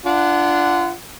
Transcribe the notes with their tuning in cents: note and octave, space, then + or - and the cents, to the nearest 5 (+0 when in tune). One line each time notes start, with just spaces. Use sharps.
D4 +0 F4 -30 F#5 +0